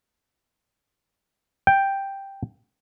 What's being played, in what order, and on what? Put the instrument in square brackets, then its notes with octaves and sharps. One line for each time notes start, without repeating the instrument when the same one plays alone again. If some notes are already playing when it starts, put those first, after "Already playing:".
[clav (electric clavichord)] G5